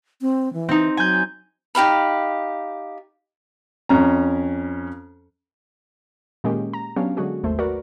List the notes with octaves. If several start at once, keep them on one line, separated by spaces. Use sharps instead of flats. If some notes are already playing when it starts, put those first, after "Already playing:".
C4
E3
C4 D#4
F#3 G#5 G6
D#4 G4 F5 B5
F2 C#4 A#5
A#2 D#3 G#3 A#3 C#4 G4
A#5
F#3 B3 C#4 D4 G4 F5
D3 F#3 G#3 F#4 G#4
G#1 D#2 A3 C5
F#4 A#4 B4 D5